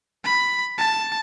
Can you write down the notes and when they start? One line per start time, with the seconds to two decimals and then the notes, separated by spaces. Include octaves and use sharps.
0.24 B5
0.78 A5